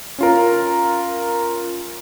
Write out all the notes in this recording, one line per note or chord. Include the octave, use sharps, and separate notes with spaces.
C#4 F4 A#4